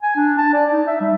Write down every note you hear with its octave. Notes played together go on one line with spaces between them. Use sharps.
G#5
D4
A5
D5
D#4
E5
G3